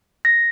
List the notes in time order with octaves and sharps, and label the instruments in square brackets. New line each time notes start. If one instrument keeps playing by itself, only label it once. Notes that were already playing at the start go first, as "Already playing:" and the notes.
[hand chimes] A#6